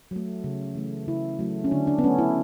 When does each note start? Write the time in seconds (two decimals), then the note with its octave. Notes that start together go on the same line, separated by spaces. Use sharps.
0.11 F#3 A3
0.44 C#3
0.75 E3 A3
1.07 C#3 E4
1.39 F#3 A3
1.64 C#4
1.71 D3 D4
1.87 D4
1.98 B3
2.03 F#3 A3 C#4
2.18 E4